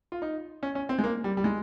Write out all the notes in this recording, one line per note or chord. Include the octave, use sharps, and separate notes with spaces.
F4
D#4
C#4
C#4
C4
G#3
A#3
G3
G3
G#3